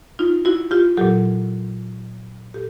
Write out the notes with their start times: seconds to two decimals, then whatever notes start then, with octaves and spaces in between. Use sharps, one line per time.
0.19 D#4 F4
0.45 E4 F#4
0.71 F4 G4
0.97 A#2 F#3 G4 A4
2.54 A#2 G4 A4